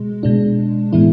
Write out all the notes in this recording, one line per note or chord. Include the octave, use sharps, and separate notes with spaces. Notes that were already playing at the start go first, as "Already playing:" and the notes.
Already playing: B2 G#3
B2 G#3 D4
A2 E3 G#3 B3 E4